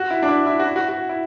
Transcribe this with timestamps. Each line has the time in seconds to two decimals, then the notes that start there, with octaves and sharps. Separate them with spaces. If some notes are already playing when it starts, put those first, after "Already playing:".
Already playing: F#4
0.11 E4
0.22 D4
0.28 E4
0.47 E4
0.60 F#4
0.64 E4
0.76 F#4
0.88 F#4
1.09 E4